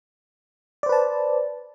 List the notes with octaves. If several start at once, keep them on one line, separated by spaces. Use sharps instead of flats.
B4 C5 D5 A5